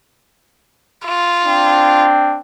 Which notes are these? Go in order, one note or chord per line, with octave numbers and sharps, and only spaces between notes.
F4
C4 D4